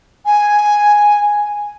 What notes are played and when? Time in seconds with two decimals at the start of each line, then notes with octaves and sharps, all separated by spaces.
0.26 G#5